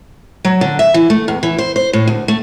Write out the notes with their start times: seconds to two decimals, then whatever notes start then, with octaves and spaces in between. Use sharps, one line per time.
0.45 F#3
0.61 D3
0.79 E5
0.94 E3
1.10 A3
1.28 E2
1.43 E3
1.58 C5
1.76 C5
1.93 A2
2.07 D2
2.28 A3